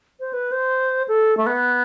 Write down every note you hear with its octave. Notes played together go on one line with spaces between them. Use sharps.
C5
B4
C5
A4
A3
B3